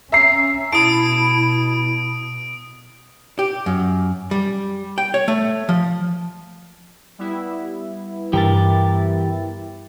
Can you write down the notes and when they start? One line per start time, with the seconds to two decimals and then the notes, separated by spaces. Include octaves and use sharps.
0.12 C#4 E5 A#5 C7
0.73 B2 E4 A5 D#6 D7
3.39 G4
3.66 F#2
4.31 G3
4.98 G5
5.14 C#5
5.28 A3
5.69 F3
7.19 G3 B3 E4
8.33 G2 E3 G4 A#4 A6